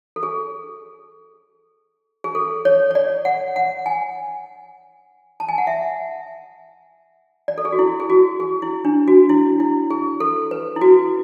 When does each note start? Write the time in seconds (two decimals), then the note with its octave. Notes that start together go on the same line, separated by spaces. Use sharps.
0.16 A4
0.23 G#4
2.24 G#4
2.35 A4
2.65 C#5
2.91 C#5
2.95 D5
3.25 F#5
3.56 F#5
3.86 G#5
5.40 A5
5.49 G#5
5.58 F#5
5.67 E5
7.48 D5
7.58 A4
7.65 G#4
7.72 F#4
7.79 E4
8.00 G#4
8.10 F#4
8.40 G#4
8.62 E4
8.85 D4
9.08 F#4
9.29 E4
9.60 E4
9.91 G#4
10.20 A4
10.51 B4
10.76 E4
10.81 F#4